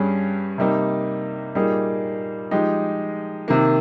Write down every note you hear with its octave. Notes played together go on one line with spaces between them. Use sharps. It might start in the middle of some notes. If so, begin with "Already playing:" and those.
Already playing: G2 G3 C#4 G#4
C3 G3 A#3 D#4
A#2 G3 A#3 D#4 G#4
F3 G#3 D#4 G4
C3 D#3 A#3